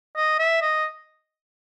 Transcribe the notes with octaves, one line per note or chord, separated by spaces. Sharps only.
D#5
E5
D#5